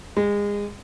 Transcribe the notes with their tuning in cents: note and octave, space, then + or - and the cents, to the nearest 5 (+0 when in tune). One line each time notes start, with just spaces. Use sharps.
G#3 -25